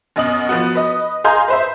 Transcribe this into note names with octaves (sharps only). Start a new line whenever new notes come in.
F#2 B2 D#5 D#6 F#7
F3 B3 F#4
B4 D#5 D#6
G#4 D#5 F5 A#5 C6 G6
B4 C5 E5